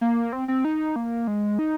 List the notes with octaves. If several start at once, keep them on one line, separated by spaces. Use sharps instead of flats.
A#3
C4
C4
D#4
A#3
G#3
D#4